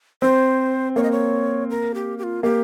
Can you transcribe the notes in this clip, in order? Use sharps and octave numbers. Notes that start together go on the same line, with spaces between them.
C4 C5
A#3 C#5
D#5
C#5
A#4
G4
G4
F4
A#3 G4